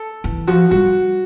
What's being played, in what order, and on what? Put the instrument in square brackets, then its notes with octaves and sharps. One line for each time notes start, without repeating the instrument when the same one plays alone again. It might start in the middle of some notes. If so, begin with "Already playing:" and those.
Already playing: [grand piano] A4
[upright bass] E3
[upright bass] F3 [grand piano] F#4
[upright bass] G3 [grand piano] F#4